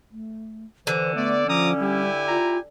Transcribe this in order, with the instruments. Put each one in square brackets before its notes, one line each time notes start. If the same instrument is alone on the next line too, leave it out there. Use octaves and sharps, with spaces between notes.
[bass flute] A3
[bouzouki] D3 [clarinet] E3 [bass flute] C5
[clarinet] A3 [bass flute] B3 [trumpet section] D5
[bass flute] F3 [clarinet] C#4 [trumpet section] A#5 D6 D#6
[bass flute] G3 [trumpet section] E4 G4 G#5
[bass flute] F4 [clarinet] A#5